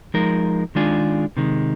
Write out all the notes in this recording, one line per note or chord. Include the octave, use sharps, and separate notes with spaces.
F3 G#3 D#4 A#4
D#3 G#3 D4 F4 G#4
C3 D#3 G#3